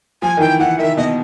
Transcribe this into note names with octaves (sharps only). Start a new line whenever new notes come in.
F3 G#5
D#3
E3 G5
E3 F#5
D#3 E5
B2 D#5